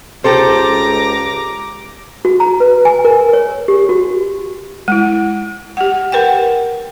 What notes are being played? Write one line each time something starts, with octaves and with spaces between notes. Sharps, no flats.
C#2 G4 A4 C5 A#5 D6
F#4
A#5
B4
G#5
A#4
C#5
G4
F#4
G#3 E4
G4 F#5
A#4 B4 F#5 G5